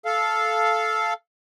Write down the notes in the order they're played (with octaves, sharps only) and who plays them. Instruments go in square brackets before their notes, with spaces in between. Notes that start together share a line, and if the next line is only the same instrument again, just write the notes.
[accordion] A4 F5